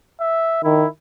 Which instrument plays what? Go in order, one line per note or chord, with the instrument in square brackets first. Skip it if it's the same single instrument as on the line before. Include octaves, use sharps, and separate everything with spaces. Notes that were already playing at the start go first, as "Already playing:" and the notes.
[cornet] E5
[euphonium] D#3 [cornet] E4